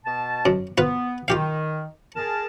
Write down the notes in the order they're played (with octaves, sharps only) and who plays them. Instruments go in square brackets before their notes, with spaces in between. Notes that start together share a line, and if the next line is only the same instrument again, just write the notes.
[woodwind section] B2 A5
[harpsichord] F#2
[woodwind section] B3 [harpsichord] F4 B4
[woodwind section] D#3 [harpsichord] F4 G4 F5
[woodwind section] G#4 A#4 A5